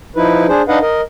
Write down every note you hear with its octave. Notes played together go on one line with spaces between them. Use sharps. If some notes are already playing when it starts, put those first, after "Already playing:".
F3 D#4 E4 B4
D4 G#4 C5
D4 D#4 B4 D#5 F5 F#5
A#4 D#5